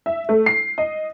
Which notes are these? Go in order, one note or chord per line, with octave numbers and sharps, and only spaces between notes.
E5
A3
C7
D#5